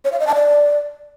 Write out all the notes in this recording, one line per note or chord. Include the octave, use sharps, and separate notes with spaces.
C#5
F5
D#5
A5
D5